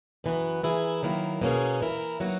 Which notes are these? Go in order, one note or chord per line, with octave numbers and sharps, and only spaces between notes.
F#2 E3 B3 F#4
E3 A#3 E4 G#4
D#3 F#3 A#3 E4
B2 A#3 C#4 G#4
E3 A#3 E4 A#4
F#3 A#3 D#4 F#4